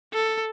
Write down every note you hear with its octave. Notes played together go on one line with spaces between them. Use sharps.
A4